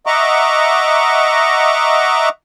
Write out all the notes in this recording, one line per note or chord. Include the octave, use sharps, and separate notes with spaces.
D#5 E5 F#5 A#5 C#6 D6